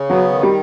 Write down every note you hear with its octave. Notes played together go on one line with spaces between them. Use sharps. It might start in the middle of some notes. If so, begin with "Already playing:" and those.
Already playing: C#3
F#3 B3
D#3
G3